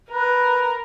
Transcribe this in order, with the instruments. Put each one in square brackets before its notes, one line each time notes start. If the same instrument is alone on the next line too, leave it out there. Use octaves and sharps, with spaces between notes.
[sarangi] A#4 [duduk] B4